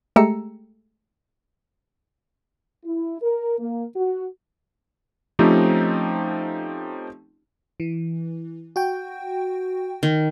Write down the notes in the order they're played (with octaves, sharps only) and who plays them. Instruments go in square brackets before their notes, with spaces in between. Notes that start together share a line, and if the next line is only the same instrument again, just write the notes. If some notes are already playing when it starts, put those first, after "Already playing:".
[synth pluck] G#3 A3 G4 A#5 E6 C#7
[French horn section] E4
A#4
A#3
F#4
[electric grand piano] F3 A3 C4 C#4 D#4 G4
[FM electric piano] E3
F#4 G5
[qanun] D#3